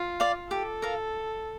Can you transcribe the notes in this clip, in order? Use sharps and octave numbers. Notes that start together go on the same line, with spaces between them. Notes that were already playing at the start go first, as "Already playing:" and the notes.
Already playing: F4
D5 F5
G4 A4
A#4 F5